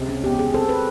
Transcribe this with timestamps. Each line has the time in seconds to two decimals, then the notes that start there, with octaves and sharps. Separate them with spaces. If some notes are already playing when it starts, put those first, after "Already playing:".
Already playing: C#2 C3
0.09 C#4
0.24 E2 G4
0.39 G#4
0.54 C4 A4
0.69 B4